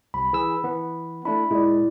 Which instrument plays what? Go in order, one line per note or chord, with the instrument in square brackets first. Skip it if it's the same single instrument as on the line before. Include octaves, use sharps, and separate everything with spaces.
[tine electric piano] C2 [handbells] B5
[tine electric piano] E3 G#4 E6
E3 B3
[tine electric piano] A3 D4 E4 [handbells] B5
[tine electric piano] A#2 G#3 [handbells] E4 D5